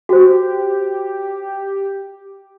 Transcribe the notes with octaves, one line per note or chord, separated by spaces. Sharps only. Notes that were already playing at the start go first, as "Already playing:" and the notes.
F#4 G4 C5